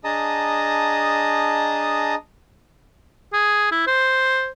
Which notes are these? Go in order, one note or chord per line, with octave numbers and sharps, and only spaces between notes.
D4 G#4 D#5 A5 A#5 D#6
G#4
E4
C5